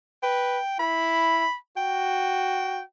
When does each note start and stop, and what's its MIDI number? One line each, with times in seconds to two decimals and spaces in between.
0.23 0.59 71
0.23 0.75 79
0.79 1.46 64
0.79 1.55 83
1.77 2.83 66
1.77 2.82 79